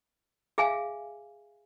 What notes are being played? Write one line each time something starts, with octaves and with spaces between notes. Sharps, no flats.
G#4 E5 F5 G#5